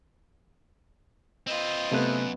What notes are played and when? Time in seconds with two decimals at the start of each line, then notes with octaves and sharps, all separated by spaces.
1.47 C4 F4 B4 D#5
1.92 F#2 C3 A3 B3 F#6